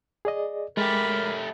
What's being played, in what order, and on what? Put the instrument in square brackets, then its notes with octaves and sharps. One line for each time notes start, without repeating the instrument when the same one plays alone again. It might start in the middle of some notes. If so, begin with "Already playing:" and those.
[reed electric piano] G#4 D5 D#5
[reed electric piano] G#3 [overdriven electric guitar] A3 G4 [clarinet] A#4 [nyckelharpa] B5